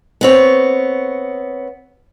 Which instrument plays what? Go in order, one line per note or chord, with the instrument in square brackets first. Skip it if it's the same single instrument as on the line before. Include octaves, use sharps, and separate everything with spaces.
[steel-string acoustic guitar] B3 C4 C#5